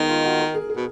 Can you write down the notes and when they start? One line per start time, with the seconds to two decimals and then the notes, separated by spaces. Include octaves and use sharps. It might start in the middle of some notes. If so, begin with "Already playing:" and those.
Already playing: D#3 G#3 B3 D#4
0.09 F4
0.24 F#4
0.40 A#4
0.54 G#4
0.70 G#4
0.76 B2